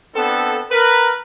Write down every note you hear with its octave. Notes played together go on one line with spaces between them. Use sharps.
B3 C4 D4 A4
A#4 B4